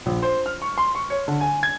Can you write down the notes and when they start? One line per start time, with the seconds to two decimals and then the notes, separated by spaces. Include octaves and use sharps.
0.06 A#1
0.23 C5
0.46 F6
0.62 C#6
0.78 C6
0.95 C#6
1.10 C#5
1.28 D3
1.41 G#5
1.63 G#6